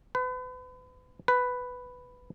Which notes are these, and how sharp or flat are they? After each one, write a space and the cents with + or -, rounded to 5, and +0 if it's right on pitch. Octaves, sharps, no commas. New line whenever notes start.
B4 +35
B4 +5